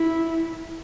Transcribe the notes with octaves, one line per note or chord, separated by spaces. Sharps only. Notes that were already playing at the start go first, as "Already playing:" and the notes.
Already playing: E4